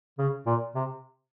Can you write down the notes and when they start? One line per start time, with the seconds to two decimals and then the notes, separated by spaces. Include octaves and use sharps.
0.18 C#3
0.46 A#2
0.75 C3